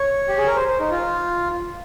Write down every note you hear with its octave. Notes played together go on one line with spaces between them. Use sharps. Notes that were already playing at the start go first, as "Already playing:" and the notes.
Already playing: C#5
G4
G#4
A#4
C5
C5
D#4
F4